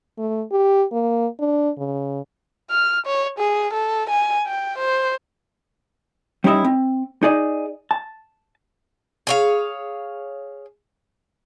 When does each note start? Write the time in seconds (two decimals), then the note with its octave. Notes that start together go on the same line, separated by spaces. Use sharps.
0.18 A3
0.52 G4
0.92 A#3
1.40 D4
1.77 C#3
2.70 F6
3.06 C#5
3.39 G#4
3.73 A4
4.10 G#5
4.47 G5
4.78 C5
6.44 G3 C#4 D#4 E4 D#5 E5
6.65 C4
7.23 D#4 G#4 D5 D#5
7.91 A5
9.27 G#4 C#5 F5